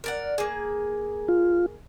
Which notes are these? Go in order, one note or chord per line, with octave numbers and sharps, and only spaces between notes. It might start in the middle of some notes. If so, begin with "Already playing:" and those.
A#4 D5 F#5
A#3 G#4
F4